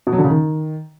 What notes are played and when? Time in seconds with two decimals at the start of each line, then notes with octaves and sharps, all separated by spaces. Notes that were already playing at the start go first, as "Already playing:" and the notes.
0.07 B2
0.12 F#3
0.18 D3
0.24 C#3
0.30 D#3